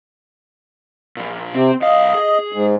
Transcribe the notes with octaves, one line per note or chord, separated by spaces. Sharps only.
A#2 F3
C3 C4
C2 D#5 F5
G#4
G#2